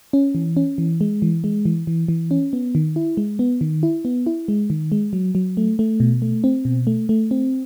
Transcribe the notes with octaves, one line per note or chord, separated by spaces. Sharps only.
C#4
E3
C#4
E3
G#3
E3
G#3
E3
E3
E3
C#4
B3
D#3
E4
G#3
B3
D#3
E4
B3
E4
G#3
D#3
G#3
F#3
F#3
A3
A3
B2
A3
C4
B2
A3
A3
C4